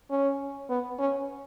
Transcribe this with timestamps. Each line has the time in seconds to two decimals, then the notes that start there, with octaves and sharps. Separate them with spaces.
0.11 C#4
0.70 B3
0.99 C#4